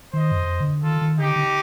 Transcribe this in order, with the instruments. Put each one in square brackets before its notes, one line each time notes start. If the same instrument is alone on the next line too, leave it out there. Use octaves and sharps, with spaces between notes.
[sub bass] D#3 [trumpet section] C5 D#5
[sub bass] G2
F2
D3
[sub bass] D#3 [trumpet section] F4 A4
[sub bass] D#3
[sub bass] D3 [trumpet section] D#4 G4
[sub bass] D3